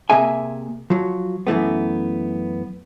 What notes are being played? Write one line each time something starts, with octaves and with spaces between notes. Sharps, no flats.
C3 A#3 G#4 E5 G#5
F3 F#3
F#2 E3 A3 B3